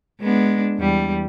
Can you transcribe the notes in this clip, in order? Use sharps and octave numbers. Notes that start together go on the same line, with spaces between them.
G#3 B3 D4
E2 G3